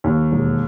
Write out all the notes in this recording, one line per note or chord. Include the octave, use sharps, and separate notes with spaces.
D#2
E1